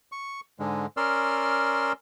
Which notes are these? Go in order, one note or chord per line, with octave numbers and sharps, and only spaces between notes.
C#6
G#2 D3 G#3
C#4 A#4 D5 C6 E6 F6